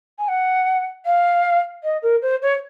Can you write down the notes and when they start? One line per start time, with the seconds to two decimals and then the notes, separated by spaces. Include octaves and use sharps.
0.19 G#5
0.28 F#5
1.06 F5
1.83 D#5
2.02 A#4
2.22 C5
2.42 C#5